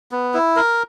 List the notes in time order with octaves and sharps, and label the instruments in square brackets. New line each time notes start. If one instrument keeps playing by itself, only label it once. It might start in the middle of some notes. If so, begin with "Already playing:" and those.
[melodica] B3
E4
A#4